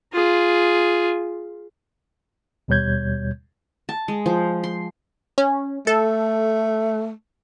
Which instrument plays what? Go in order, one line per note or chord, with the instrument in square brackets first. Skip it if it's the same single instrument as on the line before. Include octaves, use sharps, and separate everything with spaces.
[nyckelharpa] F4 G#4
[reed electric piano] D#2 B2 G3 C#5 G6 G#6
[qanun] A5
G#3
F3
C6
[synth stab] C#4
[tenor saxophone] A3 [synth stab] A4